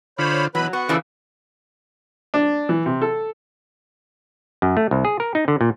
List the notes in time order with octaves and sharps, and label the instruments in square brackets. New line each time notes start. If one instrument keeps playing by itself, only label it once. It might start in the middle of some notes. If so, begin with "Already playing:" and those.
[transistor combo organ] D3 F4 [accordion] C5 C#5 B5
[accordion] B2 B4 B5 [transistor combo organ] E3 [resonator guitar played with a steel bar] F#3
[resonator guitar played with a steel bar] B3 [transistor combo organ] F#4 C#6 [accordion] F#5
[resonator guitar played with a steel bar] C#3 E3 F3 [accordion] A4 D5
[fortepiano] D4
E3
C3
A4
[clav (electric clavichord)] F#2
A3
C2
G#4
A#4
D#4
D3
A#2